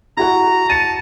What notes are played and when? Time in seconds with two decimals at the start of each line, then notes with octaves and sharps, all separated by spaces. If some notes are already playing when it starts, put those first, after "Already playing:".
0.17 E4 F#4 F#5 A#5
0.69 A5 C#7 D#7